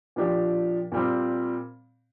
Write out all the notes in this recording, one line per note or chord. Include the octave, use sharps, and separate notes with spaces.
A#2 F3 D4 G4
A#2 G3 C4